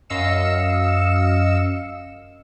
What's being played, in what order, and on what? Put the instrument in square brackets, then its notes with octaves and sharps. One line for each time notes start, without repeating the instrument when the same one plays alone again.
[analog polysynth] F#2 D#5 F5 E6 C#7 E7